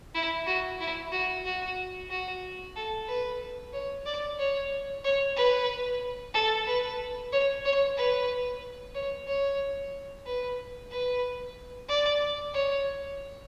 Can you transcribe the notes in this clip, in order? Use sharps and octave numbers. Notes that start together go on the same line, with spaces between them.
E4
F#4
E4
F#4
F#4
F#4
A4
B4
C#5
D5
C#5
C#5
B4
A4
B4
C#5
C#5
B4
C#5
C#5
B4
B4
D5
C#5